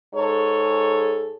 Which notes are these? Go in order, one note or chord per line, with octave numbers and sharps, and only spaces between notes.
G#2 G#4 A4 C#5